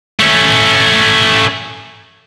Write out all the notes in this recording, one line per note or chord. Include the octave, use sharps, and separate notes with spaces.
A3 C#4